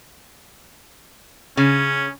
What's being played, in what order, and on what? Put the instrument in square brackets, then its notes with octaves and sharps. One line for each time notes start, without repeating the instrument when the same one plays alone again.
[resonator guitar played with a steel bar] C#3 [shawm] C#4